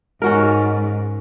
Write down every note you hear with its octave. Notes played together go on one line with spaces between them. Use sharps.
G#2 C#4 F#4 A#4